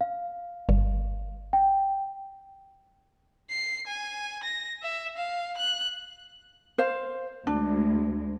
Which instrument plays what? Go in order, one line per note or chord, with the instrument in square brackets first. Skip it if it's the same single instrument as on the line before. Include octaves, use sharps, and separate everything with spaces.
[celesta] F5
[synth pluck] G1
[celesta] G5
[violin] C7
G#5
A#6
E5
F5
F#6
[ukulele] C5 F5
[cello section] D2 G#3 [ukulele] D4